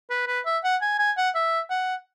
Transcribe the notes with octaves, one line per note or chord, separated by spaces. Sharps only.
B4
B4
E5
F#5
G#5
G#5
F#5
E5
F#5